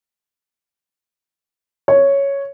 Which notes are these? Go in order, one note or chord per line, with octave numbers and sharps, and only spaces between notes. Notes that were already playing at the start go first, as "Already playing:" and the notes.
C#5